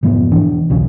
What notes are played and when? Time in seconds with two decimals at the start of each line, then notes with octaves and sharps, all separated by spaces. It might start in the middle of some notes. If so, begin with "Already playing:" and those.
0.03 F1 G#2 F3 B3
0.31 E1 E3 D4
0.70 B1 E2 C#3